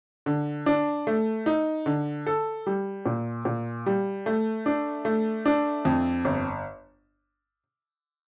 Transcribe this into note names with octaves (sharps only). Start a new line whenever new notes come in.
D3
D4
A3
D#4
D3
A4
G3
A#2
A#2
G3
A3
D4
A3
D4
F2
G1